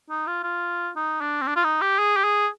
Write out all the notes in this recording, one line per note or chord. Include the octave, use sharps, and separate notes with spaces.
D#4
F4
F4
D#4
D4
C4
D4
F4
D#4
G4
G#4
G4
G#4